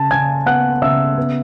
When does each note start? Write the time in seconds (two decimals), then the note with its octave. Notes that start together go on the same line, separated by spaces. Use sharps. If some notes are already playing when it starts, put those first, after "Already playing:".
Already playing: C#3 A5
0.11 C#3 G#5 G#6
0.46 B3 F#5 F#6
0.82 C#3 E5 E6
1.18 B3